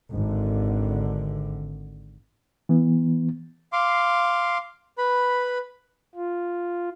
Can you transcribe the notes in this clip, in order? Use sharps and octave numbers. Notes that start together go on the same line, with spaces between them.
G#1 D3
E3 B3
F5 C6 D6
B4 B5
F4